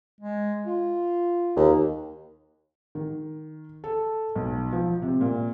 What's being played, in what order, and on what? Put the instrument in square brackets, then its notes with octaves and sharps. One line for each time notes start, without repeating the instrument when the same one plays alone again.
[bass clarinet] G#3
F4
[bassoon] D#2
[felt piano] D#3
A4
B1
F3
C3
A#2